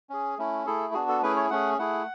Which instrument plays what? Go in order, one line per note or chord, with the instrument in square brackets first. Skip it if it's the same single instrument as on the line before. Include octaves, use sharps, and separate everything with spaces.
[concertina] C#4 G#4
A3 C#4 E4
A3 E4 G#4 A4
B3 D4 F#4 G#4
A4
A3 C#4 E4 G#4 B4
C#5
A3 C#4 G#4 F#5
A3 E4 G#4 F#5